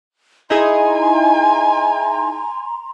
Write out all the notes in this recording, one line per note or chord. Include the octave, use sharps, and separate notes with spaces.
D#4 E4 G#4 G#5 A#5 C6